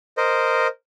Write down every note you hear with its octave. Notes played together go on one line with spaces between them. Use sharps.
A#4 C5 D#5